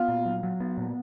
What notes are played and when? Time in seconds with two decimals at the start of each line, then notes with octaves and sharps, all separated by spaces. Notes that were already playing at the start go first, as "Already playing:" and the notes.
Already playing: B3 F4
0.08 A#2
0.25 F#3
0.43 F#3
0.60 B3
0.78 A#2